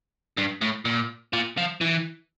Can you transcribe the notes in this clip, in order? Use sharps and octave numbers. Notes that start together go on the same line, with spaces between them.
G2
A2
A#2
A#2
F3
E3